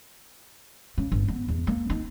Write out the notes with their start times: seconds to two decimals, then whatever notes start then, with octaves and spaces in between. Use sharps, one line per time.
0.98 C#3
1.12 G1
1.28 B3
1.48 E2
1.67 A#3
1.90 D#4